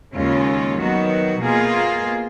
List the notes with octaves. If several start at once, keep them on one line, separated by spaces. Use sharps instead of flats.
D#2 C#3 G#3 C#4 F4
D#3 F#3 B3 F#4
B2 A#3 F4 G#4